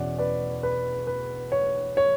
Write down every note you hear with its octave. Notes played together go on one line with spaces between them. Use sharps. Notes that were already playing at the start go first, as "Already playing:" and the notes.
Already playing: E2 B2 C#4 E4 D5 F#5
B4 D5
B4
B4
C#5
C#5